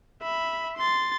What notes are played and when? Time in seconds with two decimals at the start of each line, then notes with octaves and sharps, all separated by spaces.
0.22 E5 B5
0.77 C6 A6